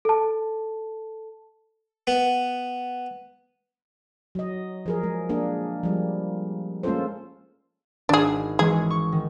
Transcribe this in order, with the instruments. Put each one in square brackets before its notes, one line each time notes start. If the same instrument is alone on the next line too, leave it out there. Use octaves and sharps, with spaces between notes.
[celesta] A4 A5
[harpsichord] B3
[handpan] F#3 D#5
F3 G#4 A#4
G#3
A#3 D4 G#4
F3 G3
G#3 A#3 C#4 F4 A4 C5
[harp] G#1 [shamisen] D4 G#4
[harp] E3 G#3 C#4 [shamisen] G#4
[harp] C#6
D#3